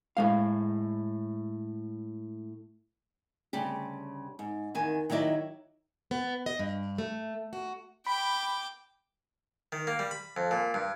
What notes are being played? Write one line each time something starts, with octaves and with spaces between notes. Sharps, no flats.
A2 G#3 F5
D2 C#3 G3 G4
G#2
E2 D#3 G#5
D#3 F#3 E4 D5 D#5
B3
D#5
G2
A3
F#4
G5 B5 D6
D#3
A#3
G3
B5
F2
A#2
G2